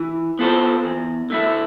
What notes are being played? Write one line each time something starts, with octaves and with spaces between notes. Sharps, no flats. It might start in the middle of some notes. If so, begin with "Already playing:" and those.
Already playing: E3
B3 F4 A4 C5
E2
D3 A3 E4